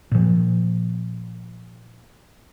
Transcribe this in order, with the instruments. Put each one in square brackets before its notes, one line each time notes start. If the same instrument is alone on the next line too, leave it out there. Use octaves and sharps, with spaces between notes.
[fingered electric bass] A#2 F3